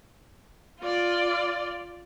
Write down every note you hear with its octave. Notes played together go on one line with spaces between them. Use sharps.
F4 D5